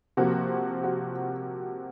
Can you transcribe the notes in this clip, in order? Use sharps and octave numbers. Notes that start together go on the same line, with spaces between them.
C3 F3 A#3 F#4
F#4